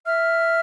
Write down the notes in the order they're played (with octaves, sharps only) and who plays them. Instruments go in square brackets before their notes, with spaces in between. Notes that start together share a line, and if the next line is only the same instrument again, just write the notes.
[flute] E5 [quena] F6